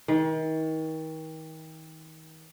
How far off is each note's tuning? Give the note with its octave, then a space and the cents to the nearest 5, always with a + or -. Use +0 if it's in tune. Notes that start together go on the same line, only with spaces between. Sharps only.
D#3 +35